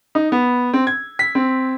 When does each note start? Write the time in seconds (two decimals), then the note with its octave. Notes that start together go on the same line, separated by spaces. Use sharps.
0.15 D#4
0.32 B3
0.74 C4
0.87 G#6
1.19 B6
1.35 C4